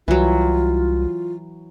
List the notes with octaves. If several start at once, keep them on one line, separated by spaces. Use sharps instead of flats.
C2 E3 F#3 F4